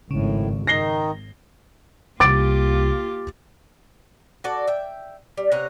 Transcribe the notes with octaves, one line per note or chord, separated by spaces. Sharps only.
G#1 F2 A2 C#3
G#1 D#3 D#4 A#6 C7 G7
C2 A#3 F4 G4 D6 A6 D7
F#4 A4 D5
E5 G5
G3
C3 C#4 F#5 A#5